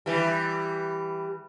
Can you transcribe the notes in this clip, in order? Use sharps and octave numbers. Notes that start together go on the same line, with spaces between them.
E3 G3